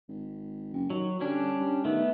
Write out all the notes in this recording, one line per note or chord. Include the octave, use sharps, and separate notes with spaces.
G#1
F#1
D#3 F#3
D3 G3 C#4 D4
G2
D#3 A3 B3